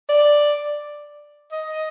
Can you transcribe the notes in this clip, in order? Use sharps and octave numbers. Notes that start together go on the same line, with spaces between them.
D5
D#5